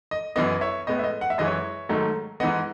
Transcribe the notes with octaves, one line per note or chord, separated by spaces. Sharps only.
D#5
F#2 E3 B3 D#5
C#5 E5
A2 G#3 B3 D#5
E5
D#5
F#5
E5
F#2 E3 G#3 D#5
C#5 E5
G#2 D#3 F#3 A3
G#2 E3 B3 D#5 F#5